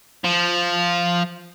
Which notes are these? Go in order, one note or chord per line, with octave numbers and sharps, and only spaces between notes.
F3